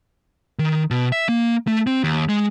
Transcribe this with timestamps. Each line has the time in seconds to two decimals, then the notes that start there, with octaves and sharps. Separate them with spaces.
0.59 D#3
0.91 B2
1.12 E5
1.29 A#3
1.67 A3
1.87 C4
2.04 D#2
2.29 G#3